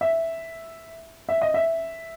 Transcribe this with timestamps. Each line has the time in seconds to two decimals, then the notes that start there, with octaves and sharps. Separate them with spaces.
0.01 E5
1.29 E5
1.41 D#5
1.54 E5